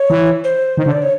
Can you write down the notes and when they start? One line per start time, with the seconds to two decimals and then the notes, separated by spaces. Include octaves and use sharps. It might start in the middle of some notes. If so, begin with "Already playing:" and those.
Already playing: C#5
0.10 E3
0.44 C5
0.77 D#3
0.86 D3
0.92 D5
1.02 C#5